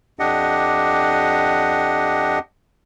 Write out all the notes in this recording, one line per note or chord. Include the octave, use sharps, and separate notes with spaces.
F2 D4 G4 D#5 F#5